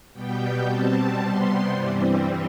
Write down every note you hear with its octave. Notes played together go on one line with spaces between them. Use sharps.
B2 G3 B3 G5
B2 G3 C4 A5
C3 G3 B3 C6
G2 E3 G3 C4